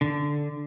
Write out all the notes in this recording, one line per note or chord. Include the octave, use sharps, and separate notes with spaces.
D3